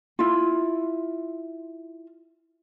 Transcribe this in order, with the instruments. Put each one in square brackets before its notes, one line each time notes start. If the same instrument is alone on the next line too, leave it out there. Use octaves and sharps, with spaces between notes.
[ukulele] E4 F4